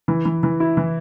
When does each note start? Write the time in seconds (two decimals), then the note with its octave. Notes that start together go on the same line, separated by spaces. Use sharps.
0.08 E3
0.25 E3
0.43 E3
0.60 E4
0.77 E3